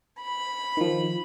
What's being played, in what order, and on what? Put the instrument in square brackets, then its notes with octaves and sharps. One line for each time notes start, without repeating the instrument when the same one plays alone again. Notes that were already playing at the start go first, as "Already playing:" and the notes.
[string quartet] B5
[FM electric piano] D#3 F3